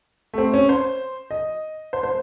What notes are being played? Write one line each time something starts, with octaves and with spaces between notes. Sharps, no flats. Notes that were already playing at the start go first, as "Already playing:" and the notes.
A3
C4
C#4
C5
D#5
C5
C5